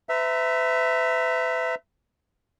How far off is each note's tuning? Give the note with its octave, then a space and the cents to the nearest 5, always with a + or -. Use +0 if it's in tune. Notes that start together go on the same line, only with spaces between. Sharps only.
B4 +45 E5 +0 A#5 -15